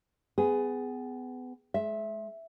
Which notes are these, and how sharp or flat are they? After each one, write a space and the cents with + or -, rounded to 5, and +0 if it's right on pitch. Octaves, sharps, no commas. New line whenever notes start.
B3 +30 G#4 +0
G#3 +35 E5 +0